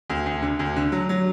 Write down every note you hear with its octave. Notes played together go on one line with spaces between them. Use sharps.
D2
D2
D3
D2
D3
F#3
F#3